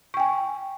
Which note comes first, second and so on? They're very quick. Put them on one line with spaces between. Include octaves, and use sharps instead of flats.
C#6 G5 G#5